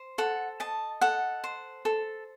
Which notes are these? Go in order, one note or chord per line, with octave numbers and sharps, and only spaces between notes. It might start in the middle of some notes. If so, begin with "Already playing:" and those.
Already playing: C5
A4 F#5
D#5 A5
A4 F#5
C5
A4